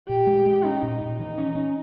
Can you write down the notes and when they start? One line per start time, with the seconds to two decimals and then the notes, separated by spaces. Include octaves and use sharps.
0.08 A#2 G4
0.27 G#3
0.46 G#3
0.64 C#4 D#4
0.82 A#2
1.01 A#2
1.19 E3 D#4
1.38 C#4
1.55 C#4